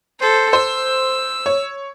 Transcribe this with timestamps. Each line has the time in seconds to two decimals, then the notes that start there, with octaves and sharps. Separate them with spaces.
0.19 A4 C5
0.53 C5 E6
1.46 C#5